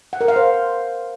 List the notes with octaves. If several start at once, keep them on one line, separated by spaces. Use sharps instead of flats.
F#5
A#4
F5
C5